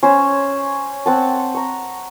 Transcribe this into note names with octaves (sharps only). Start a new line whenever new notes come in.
C#4 C5 C#5
C4 F#5 A5
A#5 C#6